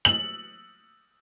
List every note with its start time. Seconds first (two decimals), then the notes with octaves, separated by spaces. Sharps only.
0.05 F#7